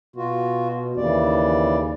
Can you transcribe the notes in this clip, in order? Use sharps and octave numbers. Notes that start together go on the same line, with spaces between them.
B2 F4 F#4
D#2 C#3 E3 D5